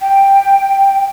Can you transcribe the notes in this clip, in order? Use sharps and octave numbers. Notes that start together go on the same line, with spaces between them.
G5